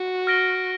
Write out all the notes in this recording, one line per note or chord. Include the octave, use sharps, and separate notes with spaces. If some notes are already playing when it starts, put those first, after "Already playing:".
Already playing: F#4
F6 A#6 D7 G7